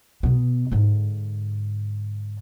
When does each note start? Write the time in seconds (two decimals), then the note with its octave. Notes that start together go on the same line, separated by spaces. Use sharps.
0.23 B2 B3
0.71 G#2 D3